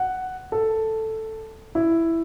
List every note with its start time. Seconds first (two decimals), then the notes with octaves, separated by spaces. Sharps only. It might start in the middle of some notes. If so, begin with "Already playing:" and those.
Already playing: F#5
0.52 A4
1.75 E4